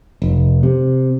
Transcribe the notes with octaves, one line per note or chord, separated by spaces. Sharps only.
F1
C3